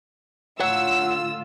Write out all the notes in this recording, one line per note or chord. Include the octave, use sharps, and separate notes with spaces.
A2 D3 F4 C#5 F#5 E6